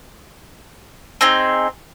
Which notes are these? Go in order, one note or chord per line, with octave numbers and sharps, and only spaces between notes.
C4 D#4 G#4